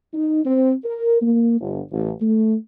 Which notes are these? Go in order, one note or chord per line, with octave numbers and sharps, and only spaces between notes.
D#4
C4
A#4
A#3
G1
A1
A3